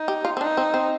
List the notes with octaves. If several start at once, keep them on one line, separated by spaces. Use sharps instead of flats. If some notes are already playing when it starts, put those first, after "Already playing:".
Already playing: D#4
G4
F4
C4
D4 D#4
C4
C4